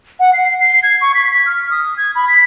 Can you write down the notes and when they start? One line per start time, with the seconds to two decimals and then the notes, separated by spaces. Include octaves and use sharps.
0.20 F#5
0.33 C7
0.61 C7
0.83 G#6
1.01 C#6
1.14 B6
1.31 B6
1.46 F6
1.71 D#6
1.97 G#6
2.15 B5
2.28 B6